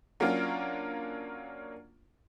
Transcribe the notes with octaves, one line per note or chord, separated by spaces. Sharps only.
F#3 A#3 C#4 D4 F4 A#4